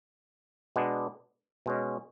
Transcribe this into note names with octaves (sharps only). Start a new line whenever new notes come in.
B2 G#3 B3 D4
B2 G#3 C#4